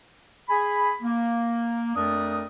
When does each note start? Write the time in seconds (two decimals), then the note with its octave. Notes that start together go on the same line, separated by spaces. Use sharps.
0.49 G#4 G#5 B5
1.02 A#3
1.95 F2 A3 D4 A#4 D5 D#6